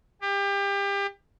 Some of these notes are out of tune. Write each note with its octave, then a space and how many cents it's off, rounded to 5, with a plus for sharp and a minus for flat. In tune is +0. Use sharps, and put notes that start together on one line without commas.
G4 +30